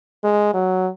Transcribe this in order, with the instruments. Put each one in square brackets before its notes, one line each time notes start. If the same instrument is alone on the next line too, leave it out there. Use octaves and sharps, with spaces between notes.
[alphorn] G#3
F#3